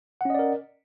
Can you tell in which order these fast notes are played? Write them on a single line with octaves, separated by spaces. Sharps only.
F#5 C#4 D#5 D5 A#4